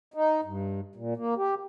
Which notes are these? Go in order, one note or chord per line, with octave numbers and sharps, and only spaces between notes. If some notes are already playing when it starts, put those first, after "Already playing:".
D#4
G2
A#2
A#3
G4